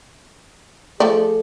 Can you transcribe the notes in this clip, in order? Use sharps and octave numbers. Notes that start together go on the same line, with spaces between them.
F3 A3 G#4 A4 D5